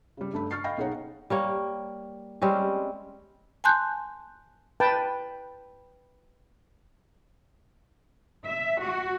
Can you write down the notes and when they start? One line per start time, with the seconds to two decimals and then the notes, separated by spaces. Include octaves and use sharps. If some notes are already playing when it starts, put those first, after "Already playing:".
0.17 C#3 G3
0.33 G2 A3 B5
0.51 C#6 F6 A6 C7
0.64 D#5 F5 G5 B5 C#6 A#6
0.78 B1 D#4 G#4 C#5 F#5
1.30 G3 A#3 C#5
2.42 G3 G#3 C4 C#4
3.64 G#5 A5 C6 F#6 G6
4.80 B4 G5 A5
8.46 E5
8.82 F#4